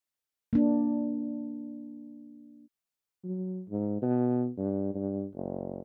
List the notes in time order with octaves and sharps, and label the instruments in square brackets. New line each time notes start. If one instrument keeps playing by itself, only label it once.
[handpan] A#3 D4
[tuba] F#3
G#2
B2
G2
G2
F#1